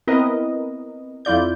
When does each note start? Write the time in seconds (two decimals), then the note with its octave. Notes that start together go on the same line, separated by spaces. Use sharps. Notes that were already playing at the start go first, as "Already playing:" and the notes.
0.07 B3 C4 E4 A#4 B4 D#5
1.25 F2 E4 F4 D5 G6